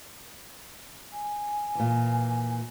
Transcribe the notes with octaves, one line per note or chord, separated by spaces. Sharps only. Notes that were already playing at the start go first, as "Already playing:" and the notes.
G#5
A#2 E3